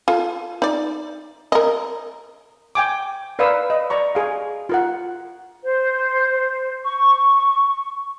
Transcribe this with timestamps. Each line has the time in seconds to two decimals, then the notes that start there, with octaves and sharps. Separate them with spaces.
0.08 F4 A4
0.62 D#4 D5
1.52 A#4 D#5
2.75 G5 G#5 D6
3.39 A#4 B4 D5 F5 D#6 E6
3.70 D#5
3.90 D5 A#5 C#6
4.15 G#4 F5
4.69 F4 A#4 F#5
5.63 C5
6.83 C#6